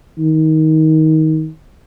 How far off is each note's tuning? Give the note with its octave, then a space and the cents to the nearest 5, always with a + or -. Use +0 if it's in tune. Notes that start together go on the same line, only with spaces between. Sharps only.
D#3 +20